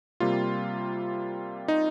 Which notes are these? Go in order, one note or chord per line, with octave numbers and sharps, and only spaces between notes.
C3 G3 A#3 F4
D#4